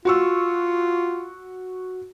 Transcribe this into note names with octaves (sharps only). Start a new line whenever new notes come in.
F4 F#4 C#6 E6